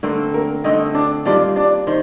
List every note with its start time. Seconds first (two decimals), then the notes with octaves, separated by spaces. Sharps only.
0.03 D3 A3 A#3 C4 A#4
0.34 A#3 A#4
0.64 D3 A3 C4 D#4 D#5
0.95 D4 D5
1.25 D#3 G3 A#3 D4 F4 D5
1.56 D4 D5
1.87 D#3 C5